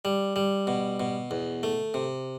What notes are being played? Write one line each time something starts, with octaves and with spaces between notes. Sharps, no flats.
G3
G3
B2
B2
E2
A3
C3